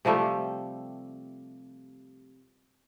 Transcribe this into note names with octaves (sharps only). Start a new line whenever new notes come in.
C3 F3 G3 A3